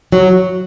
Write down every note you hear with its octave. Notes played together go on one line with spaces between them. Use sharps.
F#3